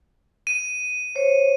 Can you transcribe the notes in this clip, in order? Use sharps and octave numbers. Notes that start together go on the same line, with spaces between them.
D#7
C5 C#5